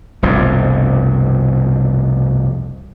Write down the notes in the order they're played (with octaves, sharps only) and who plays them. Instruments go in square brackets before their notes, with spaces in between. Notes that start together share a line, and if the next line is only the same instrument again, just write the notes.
[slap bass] F1 C2 G2 B2